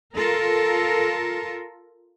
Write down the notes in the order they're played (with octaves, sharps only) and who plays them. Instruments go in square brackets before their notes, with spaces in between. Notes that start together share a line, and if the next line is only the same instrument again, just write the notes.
[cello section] F4 A4 A#4